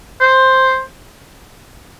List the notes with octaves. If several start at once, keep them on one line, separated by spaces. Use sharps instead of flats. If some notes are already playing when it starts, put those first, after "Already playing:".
C5